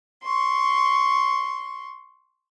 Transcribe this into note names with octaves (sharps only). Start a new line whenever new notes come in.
C6 C#6